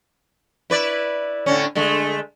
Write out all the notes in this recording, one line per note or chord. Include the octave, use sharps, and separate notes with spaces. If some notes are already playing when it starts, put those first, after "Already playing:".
E4 B4 D5
A2 D3 C#4
D3 G#3 A3